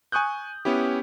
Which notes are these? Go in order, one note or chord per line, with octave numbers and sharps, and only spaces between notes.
G#5 C#6 D#6 F#6 G6
B3 C#4 E4 G4